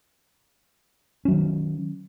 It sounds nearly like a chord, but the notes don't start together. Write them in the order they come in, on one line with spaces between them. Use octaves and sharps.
C#4 F#3 D#3